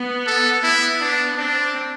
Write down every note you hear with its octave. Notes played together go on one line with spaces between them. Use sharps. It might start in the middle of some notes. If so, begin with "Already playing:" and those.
Already playing: B3
A4
B3 E4
D4
C4 D4